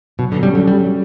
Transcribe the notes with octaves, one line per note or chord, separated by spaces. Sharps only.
B2 F#3
D3
G3 C#4 F#4 A4
F#3
F#3 G3